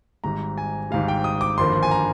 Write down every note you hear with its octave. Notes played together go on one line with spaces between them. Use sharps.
G#1 G#2 G3 A#5
G#5
G#1 G#2 G3 F5
G5
D#6
D6
G#1 G2 D3 F3 A#3 C6
G#5
A#5